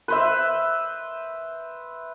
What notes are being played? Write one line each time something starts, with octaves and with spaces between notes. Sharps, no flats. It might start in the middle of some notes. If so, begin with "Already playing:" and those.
B4 C5 E5